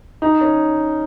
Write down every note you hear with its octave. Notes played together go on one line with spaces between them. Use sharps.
D#4
C#4